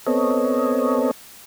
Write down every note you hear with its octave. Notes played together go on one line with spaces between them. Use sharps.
B3 C4 A4 C#5 D#5